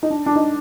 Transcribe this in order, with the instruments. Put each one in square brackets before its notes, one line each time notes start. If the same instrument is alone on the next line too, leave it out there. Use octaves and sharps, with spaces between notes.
[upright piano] D#4
D4
D4
D#4